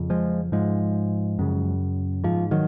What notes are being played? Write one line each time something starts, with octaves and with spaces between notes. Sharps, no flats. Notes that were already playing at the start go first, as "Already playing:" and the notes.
Already playing: F2 C#3
F3 G#3
G#2 F3 G#3
F#2 C#3
G#2 F3
D#3 F#3